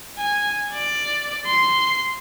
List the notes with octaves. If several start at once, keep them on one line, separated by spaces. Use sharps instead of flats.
G#5
D5
C6